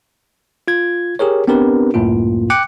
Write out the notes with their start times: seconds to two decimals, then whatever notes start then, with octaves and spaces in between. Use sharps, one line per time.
0.68 F4 G#6
1.19 G4 G#4 A#4 C#5
1.47 B3 C4 D4 G4 A#4 B4
1.94 C#2 F#2 A2 A#3 F4
2.50 G5 D6 F#6 C#7